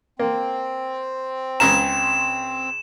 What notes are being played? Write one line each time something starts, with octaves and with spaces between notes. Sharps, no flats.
A#3 C4
C#2 C#3 A#5 E7